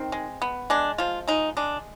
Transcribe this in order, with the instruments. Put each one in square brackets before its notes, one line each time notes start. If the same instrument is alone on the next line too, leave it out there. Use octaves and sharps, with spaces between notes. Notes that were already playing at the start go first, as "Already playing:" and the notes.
Already playing: [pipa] D#3 C4
G#3
B3
G#3 D4
F3 F4
G#3 D#4
G#3 D4